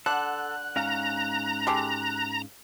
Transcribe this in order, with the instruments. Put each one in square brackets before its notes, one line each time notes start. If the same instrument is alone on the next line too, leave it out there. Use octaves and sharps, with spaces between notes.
[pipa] D3 F#5 [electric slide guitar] A4 [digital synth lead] F#6
[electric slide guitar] G#2 C#4 F5 [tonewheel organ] A#5
[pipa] G#3 G4 A4